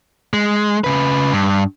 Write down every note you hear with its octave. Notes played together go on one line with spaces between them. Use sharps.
G#3
C#3 B4
G2